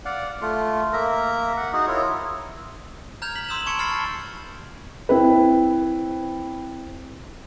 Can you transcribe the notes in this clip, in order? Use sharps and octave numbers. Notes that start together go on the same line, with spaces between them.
D5 F5 F#5
A3 F4
A#3 A#4 E5 A#5
F#5
D#4 F#4 G#4
E4 F4 A#4 C#5
A#5 F6 G6 G#6 F7
B6 F#7
C6 D#6 E6 G6 E7
A5 C#6 G#6 C#7 D7
B5 F6 A6 C7
A5
C4 E4 B4